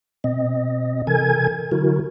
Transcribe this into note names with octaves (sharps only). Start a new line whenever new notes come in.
B2 C4 D#5
C3 E3 A4 A#4 G#5 G#6
D3 F#3 E4 F#4 A#4